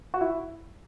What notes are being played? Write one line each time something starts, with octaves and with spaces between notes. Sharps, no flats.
F#4
E4